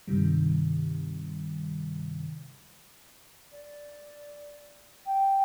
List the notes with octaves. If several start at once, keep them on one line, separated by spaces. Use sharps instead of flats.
G2 C3 D#3 G3
D5
G5